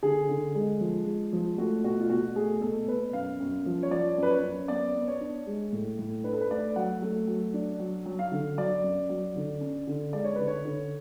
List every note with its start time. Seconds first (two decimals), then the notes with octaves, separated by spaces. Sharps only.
0.03 D3 G#4
0.29 D3
0.55 G#3
0.80 F3
1.06 G#3
1.33 F3
1.58 A3 F#4
1.84 B2 F#4
2.00 F4
2.09 B2 F#4
2.36 A3 G#4
2.62 B2 A4
2.88 B2 B4
3.13 F#2 F5
3.40 F#2
3.66 F3
3.83 C#5
3.91 F3 D5
4.18 F#2 B4
4.30 C#5
4.43 F#2
4.68 B3 D5
4.95 B3
5.08 C#5
5.21 D4
5.47 G#3
5.72 A2
5.99 A2
6.24 D4 B4
6.32 A4
6.41 B4
6.50 A3 D5
6.76 F#3 F#5
7.02 A3
7.28 F#3
7.54 D4
7.79 F#3
8.06 F#3
8.19 F5
8.32 D3
8.57 F#3 D5
8.83 F#2
9.09 F#3
9.36 D3
9.61 C#4
9.87 D3
10.13 G#3 D5
10.24 C#5
10.35 D3 B4
10.47 C#5
10.65 D3